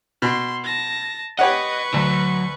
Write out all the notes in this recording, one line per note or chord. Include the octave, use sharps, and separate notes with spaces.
B2 C6
A5 A#6
G4 B4 C#5 D#5 F#5 C#6
D2 F#3